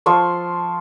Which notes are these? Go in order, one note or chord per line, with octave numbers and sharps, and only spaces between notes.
F3 A4 C6 C#6